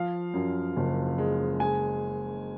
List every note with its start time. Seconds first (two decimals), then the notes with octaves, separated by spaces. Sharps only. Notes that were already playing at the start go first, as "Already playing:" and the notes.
Already playing: F3 F5
0.34 F#2
0.76 F#1
1.18 G#3
1.60 G#3 G#5